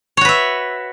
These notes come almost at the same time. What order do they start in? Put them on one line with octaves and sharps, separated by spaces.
C#5 F#4 B4 E5